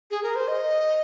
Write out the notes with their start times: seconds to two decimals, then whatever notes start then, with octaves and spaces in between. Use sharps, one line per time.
0.11 G#4
0.23 A#4
0.36 C5
0.48 D#5